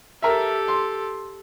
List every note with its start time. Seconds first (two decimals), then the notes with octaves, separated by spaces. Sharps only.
0.22 G4 A4 A#4 E5
0.68 C6